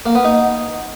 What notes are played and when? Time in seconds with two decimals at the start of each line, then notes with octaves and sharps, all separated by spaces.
0.06 A#3
0.15 B3
0.25 D#4